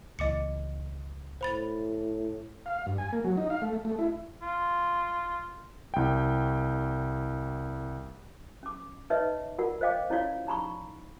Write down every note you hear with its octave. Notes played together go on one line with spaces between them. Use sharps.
C#2 A#2 E3 D#5 D6 C#7
A2 C5 B5 A6
F5
G2
G#5
A#3
F#3
D#4
F5
A3
A3
E4
F4
C2 G5
C#4 D6
D#4 B4 C#5 D#5 E5
F4 A#4 D5 F#5
C5 C#5 D#5 F5 G5 D6
C#4 E4 F4 C#5 D5 F5
D#4 A#5 B5 C#6